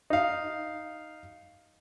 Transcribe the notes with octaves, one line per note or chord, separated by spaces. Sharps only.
D#4 F5